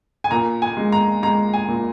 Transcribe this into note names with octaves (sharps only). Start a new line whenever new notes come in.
G#5
A#2 A#5
G#5
G#3
A#5
G#3 A#5
G#5
A#2